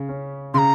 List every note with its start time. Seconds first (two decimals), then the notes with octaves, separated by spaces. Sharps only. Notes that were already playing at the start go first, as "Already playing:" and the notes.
Already playing: C#3
0.09 C#4
0.54 C#3 C6
0.58 A#5